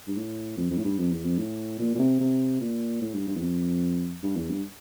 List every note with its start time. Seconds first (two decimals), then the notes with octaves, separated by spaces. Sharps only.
0.08 G2
0.17 A2
0.57 F2
0.70 F2
0.77 A2
0.85 G2
0.99 F2
1.12 E2
1.25 F2
1.38 A2
1.79 A#2
1.95 A#2
1.99 C3
2.20 C3
2.61 A#2
3.01 A2
3.14 G2
3.28 G2
3.36 E2
3.42 F2
4.23 G2
4.36 E2
4.50 G2